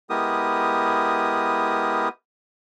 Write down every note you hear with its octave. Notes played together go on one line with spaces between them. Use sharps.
G#3 B3 E4 G4 A#4 D#6